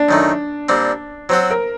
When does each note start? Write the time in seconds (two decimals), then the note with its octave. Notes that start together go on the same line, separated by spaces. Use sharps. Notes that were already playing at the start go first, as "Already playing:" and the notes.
Already playing: D4
0.09 F#2 D#3 A3
0.69 A#2 G3 C4
1.29 F#3 C4 F#4 C5
1.50 A#4